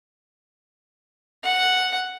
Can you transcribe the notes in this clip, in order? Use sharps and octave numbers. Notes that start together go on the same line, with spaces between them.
F#5